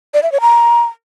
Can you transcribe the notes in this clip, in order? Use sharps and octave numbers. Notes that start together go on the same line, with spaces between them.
D5
E5
C#5
A#5